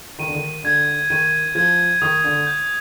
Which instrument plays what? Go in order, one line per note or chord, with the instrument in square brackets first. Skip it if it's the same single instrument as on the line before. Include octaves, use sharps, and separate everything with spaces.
[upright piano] D#3 [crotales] D#7
[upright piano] D3
D#3
[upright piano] D3 [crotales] G#6
[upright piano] D#3 [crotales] D#7
[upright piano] F3 [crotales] G#6
[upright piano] D#3 [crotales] D#6
[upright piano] D3
[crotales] G6